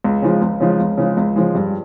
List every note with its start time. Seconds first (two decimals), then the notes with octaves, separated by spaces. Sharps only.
0.04 C#2
0.22 C#3 F3 G#3
0.42 C#2
0.60 C#3 F3 G#3
0.80 C#2
0.98 C#3 F3 G#3
1.17 C#2
1.36 C#3 F3 G#3
1.55 G2